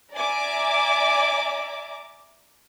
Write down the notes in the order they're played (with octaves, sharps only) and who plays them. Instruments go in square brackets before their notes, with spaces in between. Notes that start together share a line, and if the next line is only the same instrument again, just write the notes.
[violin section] D5 E5 G#5 A#5 D6